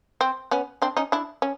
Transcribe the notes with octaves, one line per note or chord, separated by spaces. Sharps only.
C4
B3 C#4
C4 D4
C#4 D#4
D4 E4
C#4